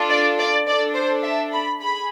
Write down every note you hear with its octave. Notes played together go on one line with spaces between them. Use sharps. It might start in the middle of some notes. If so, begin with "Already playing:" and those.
Already playing: D4 F4 A4
D5
D5
D4 A4 D5
C5
E5
B5
G#4 B5